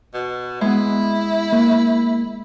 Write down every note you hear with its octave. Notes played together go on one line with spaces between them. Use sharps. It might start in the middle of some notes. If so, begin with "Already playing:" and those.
B2
G#3 B3 E4
A#3